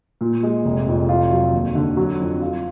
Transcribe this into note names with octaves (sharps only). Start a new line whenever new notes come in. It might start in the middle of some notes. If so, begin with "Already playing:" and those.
A#2
G#3
F1
F2
F4
F#3
D#2
D3
F#3
F2
F4